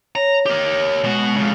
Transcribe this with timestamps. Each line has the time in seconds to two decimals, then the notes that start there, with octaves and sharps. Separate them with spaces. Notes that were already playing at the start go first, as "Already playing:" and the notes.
0.16 C#5 A#5
0.46 G4 A#4
1.04 B2 G#3 F#4
1.37 F2 C#3